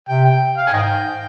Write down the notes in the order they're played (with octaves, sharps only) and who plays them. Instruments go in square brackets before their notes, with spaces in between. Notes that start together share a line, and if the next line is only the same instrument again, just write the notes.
[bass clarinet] C3 [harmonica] G5
[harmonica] G5
F5
G#5
[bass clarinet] G#2 [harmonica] D#5 G5